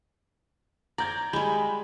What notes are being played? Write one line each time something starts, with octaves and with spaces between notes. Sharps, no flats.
D5 A#5 G6 G#6
G3 G#3 B5